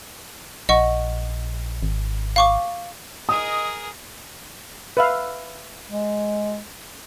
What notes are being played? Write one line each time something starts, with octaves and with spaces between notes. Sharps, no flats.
A#1 D#5 F#5 C#6
G#1
F5 C#6 D6
G#4 A#4 D#5 D#6
B4 E5 F5
G#3